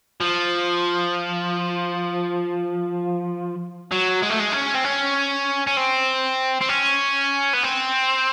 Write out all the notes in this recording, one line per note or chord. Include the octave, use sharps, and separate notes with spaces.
F3
F#3
G#3
A3
G#3
C#4
C4
C#4
C#4
C4
C4
C#4
B3
C4